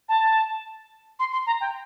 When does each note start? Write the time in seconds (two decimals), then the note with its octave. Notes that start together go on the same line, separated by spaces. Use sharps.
0.08 A5
1.19 C6
1.32 C6
1.46 A#5
1.60 G5